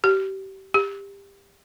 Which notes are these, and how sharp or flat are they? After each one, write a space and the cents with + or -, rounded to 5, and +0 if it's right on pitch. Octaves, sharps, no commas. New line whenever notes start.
G4 -30
G4 +20